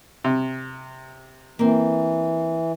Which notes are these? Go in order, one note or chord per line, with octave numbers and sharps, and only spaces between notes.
C3
E3 A#3 C4